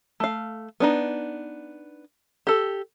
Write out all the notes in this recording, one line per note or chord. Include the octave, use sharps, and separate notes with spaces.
A3 F5
B3 D4 D#4
G4 A4